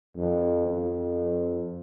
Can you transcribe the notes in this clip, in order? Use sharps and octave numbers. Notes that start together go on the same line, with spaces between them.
F2
F2